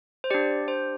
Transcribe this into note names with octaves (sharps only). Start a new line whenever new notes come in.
C5
D4 G4 D5
C5